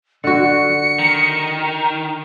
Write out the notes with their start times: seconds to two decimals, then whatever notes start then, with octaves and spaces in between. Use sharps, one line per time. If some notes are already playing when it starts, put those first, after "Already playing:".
0.24 D3 F#4 C#7
0.99 D#3